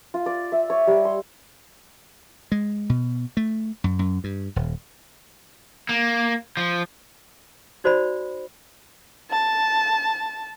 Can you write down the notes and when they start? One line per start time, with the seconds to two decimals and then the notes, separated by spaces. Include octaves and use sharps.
0.14 F4
0.26 D5
0.52 E5
0.70 C#5
0.87 G3
1.05 C6
2.52 G#3
2.89 B2
3.37 A3
3.84 F#2
3.99 F#2
4.24 G2
4.56 D#1
5.89 A#3
6.57 F3
7.84 D#4 F#4 C5 D5 B5
9.31 A5